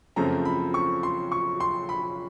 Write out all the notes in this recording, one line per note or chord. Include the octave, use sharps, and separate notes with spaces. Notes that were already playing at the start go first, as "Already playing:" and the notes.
F#2 C#3 F3 A3 C4 A#5
B5
C#6
C6
C#6
C6
B5